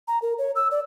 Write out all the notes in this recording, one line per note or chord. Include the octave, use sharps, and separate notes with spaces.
A#5
A#4
C#5
E6
D5